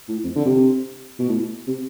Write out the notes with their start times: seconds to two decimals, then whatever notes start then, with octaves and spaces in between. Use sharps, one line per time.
0.09 A2
0.24 F2
0.36 D3
0.46 C3
1.19 B2
1.29 A2
1.67 C3